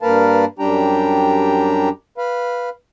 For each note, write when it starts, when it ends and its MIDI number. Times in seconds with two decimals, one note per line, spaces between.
0.01 0.45 43
0.01 0.45 58
0.01 0.45 70
0.01 0.45 71
0.01 0.45 77
0.01 0.45 81
0.59 1.89 42
0.59 1.89 55
0.59 1.89 62
0.59 1.89 67
0.59 1.89 79
0.59 1.89 82
2.18 2.69 71
2.18 2.69 77